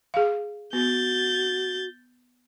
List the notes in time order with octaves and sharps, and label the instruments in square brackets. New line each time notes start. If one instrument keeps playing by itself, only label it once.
[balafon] G#4 F5
[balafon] B3 [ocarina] F#4 [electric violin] G6 A6